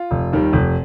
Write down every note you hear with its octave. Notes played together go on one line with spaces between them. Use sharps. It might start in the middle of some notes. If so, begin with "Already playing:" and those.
Already playing: F4
F1
D#2 D#3 G3
F1